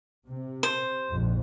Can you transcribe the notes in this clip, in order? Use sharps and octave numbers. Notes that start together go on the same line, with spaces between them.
C3
C5
A#1 F2 G#2